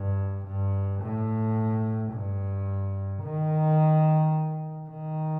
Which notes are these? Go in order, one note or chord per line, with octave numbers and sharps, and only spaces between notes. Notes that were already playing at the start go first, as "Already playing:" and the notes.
Already playing: G2
G2
A2
G2
D#3
D#3